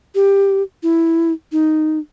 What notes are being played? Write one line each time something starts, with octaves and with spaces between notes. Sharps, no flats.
G4
E4
D#4